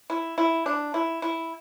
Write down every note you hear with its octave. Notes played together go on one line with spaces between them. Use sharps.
E4
E4
D4
E4
E4